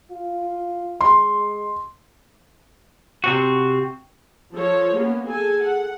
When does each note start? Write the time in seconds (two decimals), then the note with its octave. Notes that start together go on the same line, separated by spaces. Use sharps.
0.11 F4
1.01 G#3 C6
3.24 C3 C4 F#4
4.54 F3 A4 C#5
4.97 A#3 B3 C#4
5.27 G#4 A4 G#5
5.63 F#5